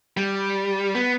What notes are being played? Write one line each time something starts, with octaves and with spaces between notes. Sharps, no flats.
G3
B3